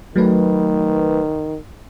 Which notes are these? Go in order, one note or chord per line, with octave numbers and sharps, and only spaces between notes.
D#3 F#3 A3 B4